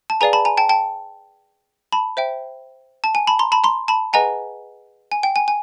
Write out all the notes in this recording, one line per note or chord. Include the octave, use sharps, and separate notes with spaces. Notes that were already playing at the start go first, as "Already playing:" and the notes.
A5
G#4 B4 D5 F5 G#5 A#5
A5 B5
G#5 A#5
G5 A5
G5 A5
A5 B5
C5 E5 G5
A5
G#5
A5 B5
A#5 C6
A5 B5
A#5 C6
A5 B5
G#4 B4 D#5 F#5 G#5 A#5
G#5
G5
G#5
G#5